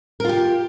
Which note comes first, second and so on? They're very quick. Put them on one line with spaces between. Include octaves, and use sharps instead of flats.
A#4 F4 G4